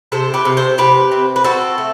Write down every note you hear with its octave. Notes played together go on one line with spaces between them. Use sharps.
C3 A4 C5
G4 B4
C3
A4 C5
C3 G4 B4
C4
B4
C4 F#4 A4
A3